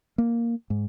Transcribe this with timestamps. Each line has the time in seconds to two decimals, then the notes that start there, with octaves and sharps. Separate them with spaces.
0.18 A#3
0.70 G#2